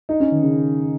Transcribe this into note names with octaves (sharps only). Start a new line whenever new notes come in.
D#4
C#4
D#3
C#3